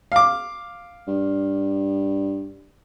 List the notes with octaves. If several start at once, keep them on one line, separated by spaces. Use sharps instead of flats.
F5 D6
G2